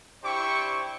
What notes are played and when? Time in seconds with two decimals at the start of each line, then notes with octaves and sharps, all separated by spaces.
0.23 D4 E4 G4 C5 G5 C#6